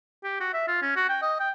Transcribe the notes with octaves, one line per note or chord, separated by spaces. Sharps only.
G4
F#4
E5
F4
C#4
F#4
G5
D#5
G5